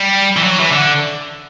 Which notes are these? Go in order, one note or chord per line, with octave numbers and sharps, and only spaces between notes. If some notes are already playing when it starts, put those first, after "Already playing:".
Already playing: G3
E3
F#3
E3
D3